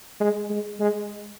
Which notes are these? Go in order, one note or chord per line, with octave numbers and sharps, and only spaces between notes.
G#3
G#3
G#3